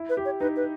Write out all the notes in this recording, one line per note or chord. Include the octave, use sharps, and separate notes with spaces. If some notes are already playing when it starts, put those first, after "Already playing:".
Already playing: E4
B4
G4
C#5
D#4 B4
B4